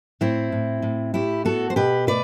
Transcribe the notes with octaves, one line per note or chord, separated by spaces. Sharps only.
A2 C4 E4
A2
A2
A2 E4 G4
B3 F#4 A4
C5
B2 G4 B4
A3 B4 D5